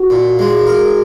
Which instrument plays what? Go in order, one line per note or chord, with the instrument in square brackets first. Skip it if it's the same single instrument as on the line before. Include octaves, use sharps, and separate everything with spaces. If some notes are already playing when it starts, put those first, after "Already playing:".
Already playing: [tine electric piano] F#4
[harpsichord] A#2
G#3
A#4